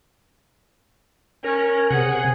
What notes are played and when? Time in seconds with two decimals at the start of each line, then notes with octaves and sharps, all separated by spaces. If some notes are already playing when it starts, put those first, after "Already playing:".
1.44 C#4 A#4
1.90 C3 G#4 F#5